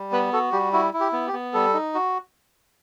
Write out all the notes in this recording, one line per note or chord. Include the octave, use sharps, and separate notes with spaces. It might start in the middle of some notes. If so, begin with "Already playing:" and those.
Already playing: G3
B3 B4
F#4 A4
G3 G4
E4 F#4
E4
G4
B3
G4
B3
G3 A4
D#4
F#4